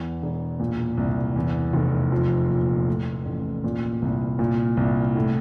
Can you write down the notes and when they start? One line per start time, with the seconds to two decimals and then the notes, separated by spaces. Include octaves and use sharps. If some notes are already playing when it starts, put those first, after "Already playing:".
Already playing: E2
0.22 E1
0.60 A#2
0.97 C2
1.36 E2
1.73 F1
2.12 F3
2.50 A#2
2.87 A2
3.25 A1
3.64 A#2
4.02 C2
4.39 A#2
4.77 C2
5.15 A2